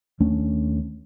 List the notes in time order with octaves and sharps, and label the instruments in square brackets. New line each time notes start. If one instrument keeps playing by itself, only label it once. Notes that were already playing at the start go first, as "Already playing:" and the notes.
[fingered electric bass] D#2 A3 C#4 D4